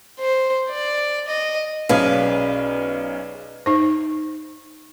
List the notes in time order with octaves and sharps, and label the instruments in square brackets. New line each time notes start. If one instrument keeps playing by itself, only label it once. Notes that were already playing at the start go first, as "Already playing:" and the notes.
[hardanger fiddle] C5
D5
D#5
[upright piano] B1 C#4 F5 [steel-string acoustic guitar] G#4 B4 D5
[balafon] D#4 C5